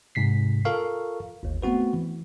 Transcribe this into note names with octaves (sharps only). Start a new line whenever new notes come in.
G#2 C3 B6 C7
F4 A4 A#4 F5 C#6
G1 D#2
A3 B3 C4 F#4 B4
E3